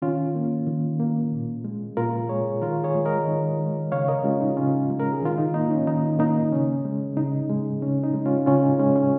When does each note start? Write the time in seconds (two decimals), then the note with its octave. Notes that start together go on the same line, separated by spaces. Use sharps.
0.02 D#3 C#4 F4
0.35 A#3
0.67 D#3
1.00 A#3
1.32 A#2
1.65 G#3
1.97 A#2 F4 A#4
2.29 G#3 G#4 C#5
2.62 D#3 F4 A#4
2.84 G#4 C#5
2.95 G#3
3.05 A#4 D#5
3.27 D#3
3.59 G#3
3.92 C#3 C#5 F5
4.08 A#4 D#5
4.24 G#3 C#4 F4
4.40 D#4
4.57 C#3 C#4 F4
4.90 G#3
4.99 A#4
5.13 G#4
5.23 D#3 F4
5.38 D#4
5.54 A#3 D#4
5.71 C#4
5.87 D#3 D#4
6.19 A#3 D#4
6.52 C#3 C#4
6.85 G#3
7.17 C#3 D#4
7.50 G#3
7.81 C#3 C#4
8.04 D#4
8.14 G#3
8.26 C#4 F4
8.46 C#3 C#4 F4
8.63 D#4
8.79 G#3 C#4
8.96 C#4